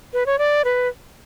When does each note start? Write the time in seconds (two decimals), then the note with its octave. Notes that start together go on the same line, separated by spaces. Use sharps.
0.13 B4
0.26 C#5
0.39 D5
0.65 B4